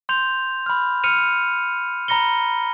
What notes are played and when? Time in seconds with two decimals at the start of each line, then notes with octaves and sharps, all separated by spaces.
0.09 C6 G6 F7
0.66 B5 F6
1.03 F6 C#7 D#7 F7
2.08 A#5 B5 A#6 C#7 G7